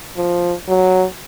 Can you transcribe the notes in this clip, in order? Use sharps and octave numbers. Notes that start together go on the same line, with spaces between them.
F3
F#3